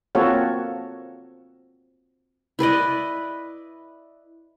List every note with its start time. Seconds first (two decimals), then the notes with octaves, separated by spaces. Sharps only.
0.15 A#3 C4 F4 F#4 A4 C#5
2.59 E4 B4 D5 D#5